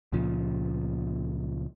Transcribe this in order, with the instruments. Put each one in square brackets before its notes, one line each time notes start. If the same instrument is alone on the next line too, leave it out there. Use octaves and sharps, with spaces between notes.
[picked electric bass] C#2 A#2 C#3 F3